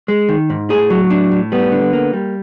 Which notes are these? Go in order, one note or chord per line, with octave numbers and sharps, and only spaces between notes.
G#3
D#3
G#2
A2 G#4
F#3
A2 D4
A2
G3 B3
D3
A#3
G3